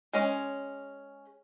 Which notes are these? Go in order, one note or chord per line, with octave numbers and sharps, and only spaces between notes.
G#3 C#4